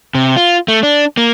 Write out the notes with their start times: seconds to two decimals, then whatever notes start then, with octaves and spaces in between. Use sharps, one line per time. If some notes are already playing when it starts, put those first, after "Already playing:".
0.15 C3
0.37 F4
0.68 A3
0.83 D4
1.17 A#3